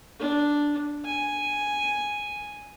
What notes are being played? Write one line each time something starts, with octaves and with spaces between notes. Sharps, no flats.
D4
G#5